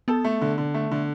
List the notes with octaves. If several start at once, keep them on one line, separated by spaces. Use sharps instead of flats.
B3 A4
A3
D3
D3
A3
D3